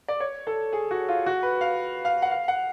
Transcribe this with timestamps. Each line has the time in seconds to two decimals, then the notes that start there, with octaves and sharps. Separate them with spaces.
0.08 D5
0.20 C#5
0.47 A4
0.73 G#4
0.91 F#4
1.08 F4
1.26 F#4
1.43 B4
1.61 F5
2.05 F5
2.22 F#5
2.31 F5
2.48 F#5